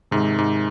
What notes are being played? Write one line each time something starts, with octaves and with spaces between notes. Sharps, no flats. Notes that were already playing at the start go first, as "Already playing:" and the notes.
G#2 C3 D#3 G#3
G#2